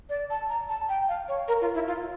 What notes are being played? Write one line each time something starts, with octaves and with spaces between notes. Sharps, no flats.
D5
A5
A#5
A5
G5
F5
C#5
A#4
F4
E4
F4